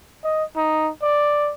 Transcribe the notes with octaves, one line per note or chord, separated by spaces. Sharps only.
D#5
D#4
D5